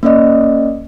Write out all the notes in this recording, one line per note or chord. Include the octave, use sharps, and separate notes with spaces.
A#3 C#4 D5 D#5